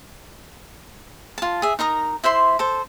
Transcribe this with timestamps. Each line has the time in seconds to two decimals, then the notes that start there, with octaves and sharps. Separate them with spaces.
1.38 F4 A5
1.62 G#4 E5
1.79 D#4 A#4 A#5 D#6
2.24 E4 C5 E5 C6
2.59 A4 C5